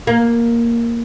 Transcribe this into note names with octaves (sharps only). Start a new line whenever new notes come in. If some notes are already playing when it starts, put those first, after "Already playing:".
A#3